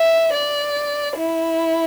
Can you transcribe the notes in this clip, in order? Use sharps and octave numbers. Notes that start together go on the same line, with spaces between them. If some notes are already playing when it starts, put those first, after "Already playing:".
Already playing: E5
D5
E4